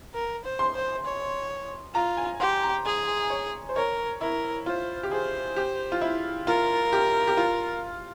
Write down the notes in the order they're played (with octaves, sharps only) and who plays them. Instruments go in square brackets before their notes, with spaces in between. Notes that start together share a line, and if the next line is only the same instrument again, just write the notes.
[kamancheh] A#4
C5
[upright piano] C6
[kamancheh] C5
C#5
[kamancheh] F4 [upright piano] A#5
[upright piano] G#5
[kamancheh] G4 [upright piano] C6
[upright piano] A#5
[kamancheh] G#4 [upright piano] G#5
[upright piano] C#5
C5
[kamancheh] A#4 [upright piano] C#5
[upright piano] E4 [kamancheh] A#4
[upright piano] F4 [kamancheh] C5
[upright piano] G4
[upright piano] G#4 [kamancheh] C5
[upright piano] G4
F4
E4
[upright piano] F4 [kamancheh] A#4
[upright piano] G4
G4
F4